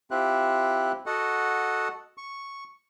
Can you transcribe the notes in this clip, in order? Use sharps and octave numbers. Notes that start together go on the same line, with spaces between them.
C4 E4 F4 G4 E5 F#6
F#4 A4 D#5 F#5
C#6